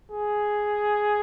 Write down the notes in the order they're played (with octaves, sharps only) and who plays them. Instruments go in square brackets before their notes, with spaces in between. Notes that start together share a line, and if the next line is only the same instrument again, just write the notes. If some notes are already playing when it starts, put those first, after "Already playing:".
[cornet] G#4